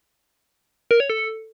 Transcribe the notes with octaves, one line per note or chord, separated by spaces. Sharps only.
A#4
C#5
A4